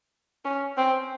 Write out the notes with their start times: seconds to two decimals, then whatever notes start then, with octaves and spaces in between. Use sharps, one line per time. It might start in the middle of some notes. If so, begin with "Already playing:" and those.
0.45 C#4
0.77 C4